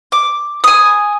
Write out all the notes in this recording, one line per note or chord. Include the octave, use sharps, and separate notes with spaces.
D6
G#5 D#6